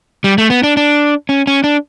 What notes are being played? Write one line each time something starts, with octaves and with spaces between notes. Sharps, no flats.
G3
A3
B3
D4
D4
C#4
C#4
D4